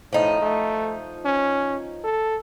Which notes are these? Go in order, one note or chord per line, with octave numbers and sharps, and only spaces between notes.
A2 F3 D#4
A3
C#4
A4